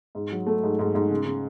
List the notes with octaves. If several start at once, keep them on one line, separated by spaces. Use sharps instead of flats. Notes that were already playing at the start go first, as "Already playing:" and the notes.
G#2
F#3
A3
G#2
G#2
G#2
C#3
C#3